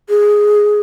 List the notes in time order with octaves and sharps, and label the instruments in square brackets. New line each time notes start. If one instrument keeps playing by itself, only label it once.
[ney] G#4